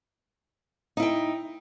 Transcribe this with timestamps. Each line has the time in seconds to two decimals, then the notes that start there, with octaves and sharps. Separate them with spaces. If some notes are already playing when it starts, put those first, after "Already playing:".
0.97 D#4
1.00 E4
1.02 G5